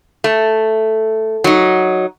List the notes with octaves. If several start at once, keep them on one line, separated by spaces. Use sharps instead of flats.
A3
F#3 D#4